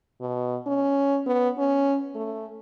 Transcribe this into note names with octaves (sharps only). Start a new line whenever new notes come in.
B2
C#4
B3
C#4
A3